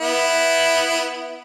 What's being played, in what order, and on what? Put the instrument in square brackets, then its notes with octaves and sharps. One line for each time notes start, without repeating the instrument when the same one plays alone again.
[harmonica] B3 E4